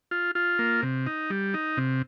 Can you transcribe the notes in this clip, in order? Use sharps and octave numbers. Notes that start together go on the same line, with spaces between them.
F4
F4
A#3
C3
D#4
G3
D#4
C3